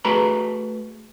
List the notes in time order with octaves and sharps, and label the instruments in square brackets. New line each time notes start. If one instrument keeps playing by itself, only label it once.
[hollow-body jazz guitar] A3 F#4 G#4 B4 A#5 B5